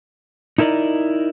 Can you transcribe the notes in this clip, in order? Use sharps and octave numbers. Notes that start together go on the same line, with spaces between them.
D#4 E4 A#4 C5 D5 D#5